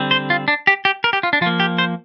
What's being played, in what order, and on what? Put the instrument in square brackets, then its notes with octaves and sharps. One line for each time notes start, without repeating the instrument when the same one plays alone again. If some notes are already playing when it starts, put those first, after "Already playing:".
Already playing: [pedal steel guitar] D3 G3 C4
C5
F4
D4
G4
G4
A#4
G4
F4
D4
F3 F4
A#3
G4
C5